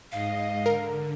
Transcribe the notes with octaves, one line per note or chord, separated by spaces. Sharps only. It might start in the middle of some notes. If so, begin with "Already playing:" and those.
G#2 D#5 F5
D3 A#4